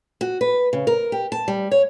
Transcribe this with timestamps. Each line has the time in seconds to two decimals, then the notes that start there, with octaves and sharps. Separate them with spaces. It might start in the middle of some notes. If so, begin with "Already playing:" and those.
0.21 F#4
0.41 B4
0.73 C#3
0.87 A#4
1.12 G4
1.32 A5
1.48 G3
1.71 C#5